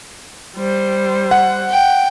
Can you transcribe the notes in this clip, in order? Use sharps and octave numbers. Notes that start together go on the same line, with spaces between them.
G3 C5
F#5
G5